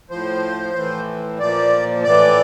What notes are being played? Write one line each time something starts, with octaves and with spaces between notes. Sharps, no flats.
A2 F3 C5
A2 E3
A#2 F3 D5
A2 E3 D5